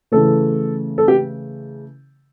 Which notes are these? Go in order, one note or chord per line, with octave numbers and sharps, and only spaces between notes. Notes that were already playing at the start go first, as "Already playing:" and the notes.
C#3 E3 A3 A4
A4
G4